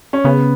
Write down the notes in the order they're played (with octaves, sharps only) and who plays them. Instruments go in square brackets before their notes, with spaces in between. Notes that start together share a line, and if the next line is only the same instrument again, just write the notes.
[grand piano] C#4
[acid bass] C#3 [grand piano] B3